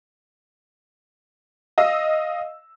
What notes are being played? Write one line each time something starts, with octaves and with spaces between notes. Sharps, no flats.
D#5 F5 E6